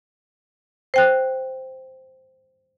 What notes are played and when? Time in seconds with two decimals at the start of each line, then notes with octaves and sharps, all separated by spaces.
0.94 C5 G5 F#6